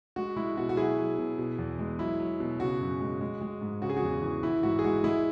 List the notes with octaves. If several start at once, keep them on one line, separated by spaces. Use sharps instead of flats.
G#3 F#4
G#3 E4
B2 F#4
F#4
F#3 E4 G#4
F#3
B2
B2
E2
G#3
F#3 E4
F#3
B2
C#3 F#4
F#2
G#3
G#3
G#3
G#2
C#3 F#4
G#4
F#4
E2
E3
E3 E4
G#2 F#4
G#4
G#3 F#4
G#3 E4 G#4